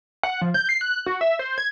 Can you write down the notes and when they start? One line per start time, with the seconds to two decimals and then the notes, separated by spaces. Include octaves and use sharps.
0.23 F#5
0.41 F3
0.54 G6
0.69 C7
0.81 F#6
1.06 F#4
1.21 E5
1.39 C5
1.58 G#6